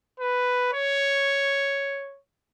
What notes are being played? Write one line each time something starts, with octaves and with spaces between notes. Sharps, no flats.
B4
C#5